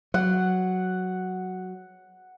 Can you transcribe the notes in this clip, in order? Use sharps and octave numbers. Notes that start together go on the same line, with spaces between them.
F#3 F#5